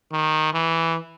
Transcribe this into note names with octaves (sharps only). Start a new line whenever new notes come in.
D#3
E3